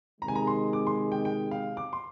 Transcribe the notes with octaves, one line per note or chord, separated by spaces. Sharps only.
C3 D#3 G#3 A#5
G#5
A#5
C6
D6
C6
G5
G5
F5
D6
C6